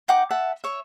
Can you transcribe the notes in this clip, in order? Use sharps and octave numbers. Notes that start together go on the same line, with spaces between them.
D#4 F#5 G5 D6
E5 F#5 A5
C#5 E5